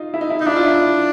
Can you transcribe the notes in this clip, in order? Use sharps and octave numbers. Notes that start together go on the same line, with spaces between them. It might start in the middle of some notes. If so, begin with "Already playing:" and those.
Already playing: D#4 F4
E4
D#4
E4
D#4
D4 E4
F4
E4